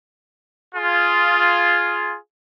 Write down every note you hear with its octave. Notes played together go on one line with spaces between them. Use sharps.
F4 G#4